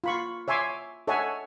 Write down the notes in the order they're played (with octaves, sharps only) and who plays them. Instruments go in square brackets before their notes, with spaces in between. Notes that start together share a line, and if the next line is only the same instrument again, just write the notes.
[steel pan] F4 B5 C#6
C#5 E5 G#5 C6 D6
A4 C#5 D#5 E5 F#5 G#5